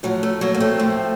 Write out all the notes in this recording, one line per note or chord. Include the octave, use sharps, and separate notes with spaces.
A2 F3 F#3
A3
F#3 A#3
A#3
A3 C4
A2 F3